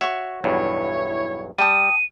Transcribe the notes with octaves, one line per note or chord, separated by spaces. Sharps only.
F#4 C#5 E5 C#6
B1 E2 G2 E4 C#5
G3 G5 A5 D#6 D#7